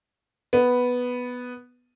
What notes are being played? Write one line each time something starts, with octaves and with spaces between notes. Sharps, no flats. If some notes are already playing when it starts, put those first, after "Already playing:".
B3